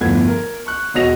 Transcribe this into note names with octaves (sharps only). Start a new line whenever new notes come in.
G1 A2 F3 B3 G#6
A#4
C#6 F#6
E1 F#4 C#5 D#5 A#6 F7